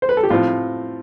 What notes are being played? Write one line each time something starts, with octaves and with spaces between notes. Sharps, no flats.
C5
B4
A4
G4
A2 F3 C4 F4